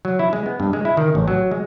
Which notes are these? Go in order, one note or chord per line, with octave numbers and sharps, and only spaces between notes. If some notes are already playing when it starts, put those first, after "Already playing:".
F#3
E4
G#3
B3
G2
G#3
E4
D#3
A1
F#3
G#3